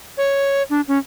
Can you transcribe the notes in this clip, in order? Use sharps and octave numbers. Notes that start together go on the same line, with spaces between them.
C#5
D4
C#4